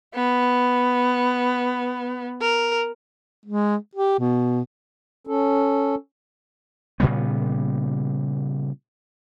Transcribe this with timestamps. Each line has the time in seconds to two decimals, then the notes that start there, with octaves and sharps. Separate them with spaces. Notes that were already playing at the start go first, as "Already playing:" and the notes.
0.15 B3
2.42 A#4
3.46 G#3
3.95 G4
4.19 B2
5.27 C#4 A4
7.00 A#2 C#3 G3 B3